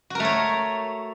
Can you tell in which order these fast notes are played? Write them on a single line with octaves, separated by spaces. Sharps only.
F#4 A#4 A3 C#5